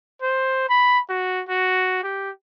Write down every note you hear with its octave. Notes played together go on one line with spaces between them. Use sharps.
C5
B5
F#4
F#4
G4